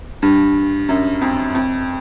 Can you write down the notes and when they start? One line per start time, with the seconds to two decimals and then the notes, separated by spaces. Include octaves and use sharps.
0.22 G2
0.89 F#2
1.21 F2
1.55 F2